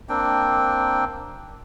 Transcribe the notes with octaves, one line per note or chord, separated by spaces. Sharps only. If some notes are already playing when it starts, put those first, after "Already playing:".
A#3 C4 D4 G5